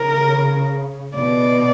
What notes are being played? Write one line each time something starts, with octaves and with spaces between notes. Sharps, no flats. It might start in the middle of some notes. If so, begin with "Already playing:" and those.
Already playing: C#3 A#4
B2 D5